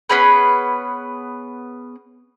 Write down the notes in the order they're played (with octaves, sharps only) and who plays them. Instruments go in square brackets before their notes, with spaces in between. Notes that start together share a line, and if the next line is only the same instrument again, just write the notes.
[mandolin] B3 C#4 G#4 B4